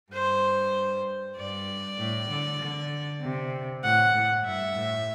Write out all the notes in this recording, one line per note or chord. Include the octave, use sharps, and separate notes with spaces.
G2 C5
G2 D5
A2
D3
D3
C3
A2 F#5
A2
G2 E5
A2